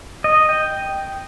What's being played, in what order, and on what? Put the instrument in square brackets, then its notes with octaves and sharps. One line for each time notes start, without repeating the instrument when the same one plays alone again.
[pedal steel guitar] D#5
G5